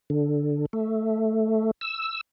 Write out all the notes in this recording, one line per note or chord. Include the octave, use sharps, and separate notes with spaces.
D3
A3
E6